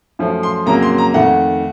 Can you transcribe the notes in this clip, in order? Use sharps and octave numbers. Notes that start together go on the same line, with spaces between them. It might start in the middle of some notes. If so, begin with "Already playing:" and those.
F#2 F3 A3
C6
F2 C#3 F#3 A#3 A#5
C6
A#5
F2 D#3 A3 F#5